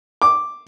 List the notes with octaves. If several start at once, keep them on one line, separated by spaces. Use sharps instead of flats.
D6